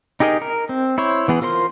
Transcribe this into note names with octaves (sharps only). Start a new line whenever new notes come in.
D#4 G4 G#4 A#4 D#5
A#4
C4
E4 C5 C#5
E3 B3 G#4
F4 A#4 C5 C6